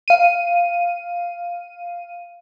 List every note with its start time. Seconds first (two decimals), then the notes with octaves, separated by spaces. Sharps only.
0.08 F5 D#7